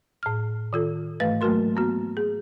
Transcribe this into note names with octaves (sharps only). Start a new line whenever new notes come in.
A2 F6
D#3 F4 A4
G#2 E3 A3 B4 F5 A6
F#3 A3 A#3 F#4 A#4 C6
A#3 B3 F#4
G#4